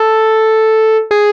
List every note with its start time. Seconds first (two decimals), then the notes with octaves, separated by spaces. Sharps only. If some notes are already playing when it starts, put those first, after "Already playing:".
Already playing: A4
1.11 G#4